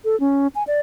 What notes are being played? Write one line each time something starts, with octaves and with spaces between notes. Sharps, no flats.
A4
C#4
G#5
D5